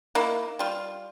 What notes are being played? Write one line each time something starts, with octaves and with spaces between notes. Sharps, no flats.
A#3 D#4 E4
G3 F4